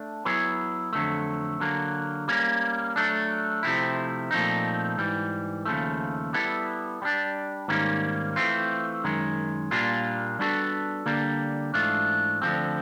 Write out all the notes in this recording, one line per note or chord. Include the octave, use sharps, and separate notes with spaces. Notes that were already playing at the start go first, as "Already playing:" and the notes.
Already playing: A3 D4
F#3 B3 E4 G#4 C#5
F2 D3 F#3 A3
D3 F#3 A#3
G3 A#3 C#4
F#3 A3 D4
C3 F3 A3 C4 E4
A#2 F3 A3 C4 D#4
G#2 E3 G3
D#2 C#3 F3 A3
G3 B3 E4 A4
G3 B3 D4
G#2 D#3 G3 A#3 C#4
E3 A3 C4 F4
F#2 D#3 G#3
A#2 G3 A#3 D4 F4
G3 B3 D4 F#4 A4
D3 G3 A#3 D4
G#2 E3 A3 D4 F4
D2 D3 F3 A3 C4